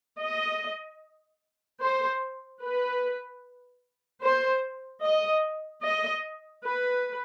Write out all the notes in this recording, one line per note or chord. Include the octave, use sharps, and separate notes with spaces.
D#5
C5
B4
C5
D#5
D#5
B4